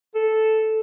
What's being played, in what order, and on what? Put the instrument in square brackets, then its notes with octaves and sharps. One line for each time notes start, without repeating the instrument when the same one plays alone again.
[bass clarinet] A4